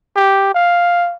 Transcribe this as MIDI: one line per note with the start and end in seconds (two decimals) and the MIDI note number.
0.16 0.50 67
0.55 1.15 77